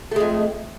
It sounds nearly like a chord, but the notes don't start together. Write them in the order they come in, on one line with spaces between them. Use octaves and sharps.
A3 G#3 F2